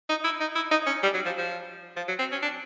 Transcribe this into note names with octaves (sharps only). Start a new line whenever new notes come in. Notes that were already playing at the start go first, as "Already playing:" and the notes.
D#4
E4
D#4
E4
D#4
C#4
G3
F#3
F3
F3
F3
F#3
C4
C#4
D4